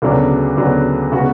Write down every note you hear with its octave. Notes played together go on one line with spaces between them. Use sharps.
D2 C#3 F#3 B3 D4
D2 C#3 F#3 B3 D4
C#3 G#3 B3 F#4 B4